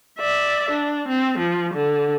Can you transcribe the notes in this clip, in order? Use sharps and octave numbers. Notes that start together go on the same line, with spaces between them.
D5 E5
D4
C4
F3
D3